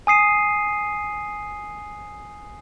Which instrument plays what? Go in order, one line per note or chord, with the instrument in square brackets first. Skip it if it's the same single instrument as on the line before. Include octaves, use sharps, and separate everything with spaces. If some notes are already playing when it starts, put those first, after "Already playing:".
[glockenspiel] G#5 D#6 C7 D#7